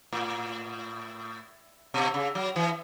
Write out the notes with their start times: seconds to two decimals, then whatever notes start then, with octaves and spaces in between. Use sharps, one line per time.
0.13 A2
1.94 B2
2.14 C#3
2.35 F#3
2.56 E3